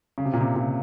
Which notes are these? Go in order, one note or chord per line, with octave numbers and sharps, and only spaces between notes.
C#3
C3
A#2
C3
A#2